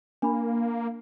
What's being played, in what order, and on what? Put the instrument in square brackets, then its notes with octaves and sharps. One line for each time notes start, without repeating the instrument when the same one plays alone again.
[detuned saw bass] A#3 [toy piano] D4 B5